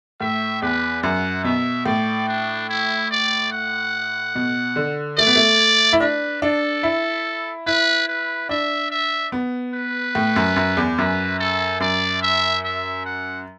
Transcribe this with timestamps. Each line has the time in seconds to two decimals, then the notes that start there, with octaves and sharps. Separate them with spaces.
0.21 A2 E5
0.62 E2 B4
1.03 F#2 F#5
1.44 B2 E5
1.86 A2 D5
2.28 D4
2.69 E4
3.11 D5
3.52 F#5
4.35 B2
4.76 D3
5.17 A3 D5
5.27 B3
5.36 A3
5.93 E4
6.00 D4 B4
6.42 D4 A4
6.83 E4
7.67 E4 B4
8.08 B4
8.49 D4 E5
8.91 E5
9.32 B3
9.74 B4
10.15 A2
10.36 F#2
10.56 F#2
10.77 E2
10.98 F#2 B4
11.40 A4
11.80 F#2 D5
12.22 E5
12.64 E5
13.05 F#5